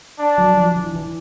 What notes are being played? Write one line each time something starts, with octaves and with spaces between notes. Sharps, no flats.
D4
F#3
F3
E3
E3